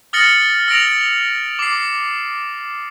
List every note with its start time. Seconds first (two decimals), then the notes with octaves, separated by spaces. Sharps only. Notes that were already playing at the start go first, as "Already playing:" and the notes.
0.13 D#6 F6 A6 A#6 C#7 F#7
0.68 E6 A#6 D7 F7
1.59 D6 C7